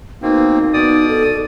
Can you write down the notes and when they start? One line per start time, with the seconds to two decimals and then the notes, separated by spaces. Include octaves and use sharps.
0.22 B2 A#3 C4 D#4
0.74 B2 D5 D#6
1.08 A4